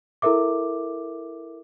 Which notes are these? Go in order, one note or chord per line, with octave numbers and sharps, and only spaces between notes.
E4 A4 A#4 E5 D6